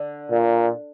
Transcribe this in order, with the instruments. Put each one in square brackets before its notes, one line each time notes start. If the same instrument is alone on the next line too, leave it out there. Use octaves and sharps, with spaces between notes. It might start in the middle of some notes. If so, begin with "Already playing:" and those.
Already playing: [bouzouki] D3
[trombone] A#2